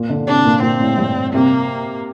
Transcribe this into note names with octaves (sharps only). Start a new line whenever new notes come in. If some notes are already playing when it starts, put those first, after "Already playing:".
Already playing: A#2
D3
C3 D4
A#2
A#2 C4
A2
G2
C3 A#3